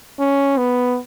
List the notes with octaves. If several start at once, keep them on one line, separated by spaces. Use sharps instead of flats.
C#4
B3